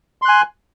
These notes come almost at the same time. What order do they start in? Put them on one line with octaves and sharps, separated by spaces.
C6 F#6 G#5